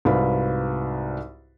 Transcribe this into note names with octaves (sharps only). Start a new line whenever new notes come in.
C2 G#2 F#4 B4 F5 B5